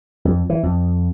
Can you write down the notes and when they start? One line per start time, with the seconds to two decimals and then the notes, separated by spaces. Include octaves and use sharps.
0.25 F2
0.50 E3
0.63 F2